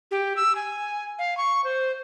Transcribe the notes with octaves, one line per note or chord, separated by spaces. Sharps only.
G4
E6
G#5
F5
C#6
C5